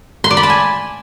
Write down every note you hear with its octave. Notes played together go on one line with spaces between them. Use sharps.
C6
D5
B5
A5
G#5